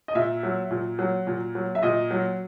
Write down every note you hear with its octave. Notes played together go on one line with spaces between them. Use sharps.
D#5
A#2 E5
F#3
A#2
F#3
A#2
F#3
E5
A#2 D#5
F#3